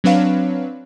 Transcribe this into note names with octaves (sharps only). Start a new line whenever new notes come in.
F#3 C4 D4 B4 C#5 F5